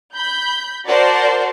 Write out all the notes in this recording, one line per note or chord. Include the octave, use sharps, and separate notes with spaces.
B5 G6
F#4 A#4 C5 D5 A5